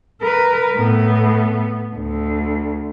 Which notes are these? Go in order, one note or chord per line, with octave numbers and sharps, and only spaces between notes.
A#4 B4
A2 B3
D2